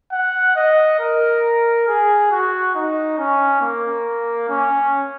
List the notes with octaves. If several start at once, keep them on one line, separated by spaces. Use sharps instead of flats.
F#5
D#5
A#4
G#4
F#4
D#4
C#4
A#3
C#4